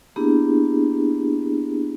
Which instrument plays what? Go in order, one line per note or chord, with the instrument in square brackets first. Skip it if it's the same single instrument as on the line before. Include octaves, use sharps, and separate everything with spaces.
[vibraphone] A#3 B3 D4 E4 G4 G#4